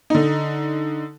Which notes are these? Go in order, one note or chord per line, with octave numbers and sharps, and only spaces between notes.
D3 D#4